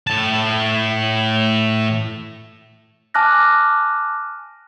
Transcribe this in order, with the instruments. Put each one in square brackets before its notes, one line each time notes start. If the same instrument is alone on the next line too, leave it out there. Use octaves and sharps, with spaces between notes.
[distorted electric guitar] A2 A5
[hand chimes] G#5 A5 D6 F6 F#6 A#6